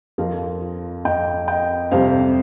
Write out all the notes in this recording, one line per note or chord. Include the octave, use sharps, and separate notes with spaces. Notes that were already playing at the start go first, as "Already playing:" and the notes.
F2 F3 F4 A#4
F4
F2 F3 D#5 G5
D#5 G5
F2 C3 G3 C5 F5